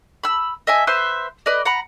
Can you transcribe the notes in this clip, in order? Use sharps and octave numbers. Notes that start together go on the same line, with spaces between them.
B5 E6
D#5 E5 G#5
B4 C5 E5 C6
B4 D5 D#5
F#5 A#5 B5